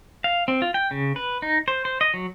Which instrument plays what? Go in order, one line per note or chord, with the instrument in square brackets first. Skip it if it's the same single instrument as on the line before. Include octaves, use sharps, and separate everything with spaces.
[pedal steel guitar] F5
C4
F4
G5
C#3
B4
D#4
C5
C5
D#5
F#3